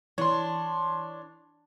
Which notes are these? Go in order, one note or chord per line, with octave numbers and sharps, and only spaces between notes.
E3 D4 C#5 C6